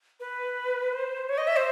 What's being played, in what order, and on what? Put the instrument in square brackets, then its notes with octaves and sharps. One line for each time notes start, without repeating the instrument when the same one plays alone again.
[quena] B4
C5
C#5
D#5
E5
C5